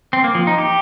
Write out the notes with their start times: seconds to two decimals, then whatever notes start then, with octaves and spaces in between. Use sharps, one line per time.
0.13 C4
0.24 A#3
0.35 F3
0.47 D#4
0.58 G4